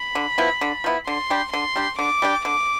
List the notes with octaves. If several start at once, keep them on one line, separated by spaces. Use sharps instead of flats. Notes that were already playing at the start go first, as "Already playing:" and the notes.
Already playing: B5
D3
F3 B3 E4
D3
F3 B3 E4
D3 C6
G3 D4 G4
D3 C6
G3 D4 G4
D3 D6
G3 D4 G4
D3 D6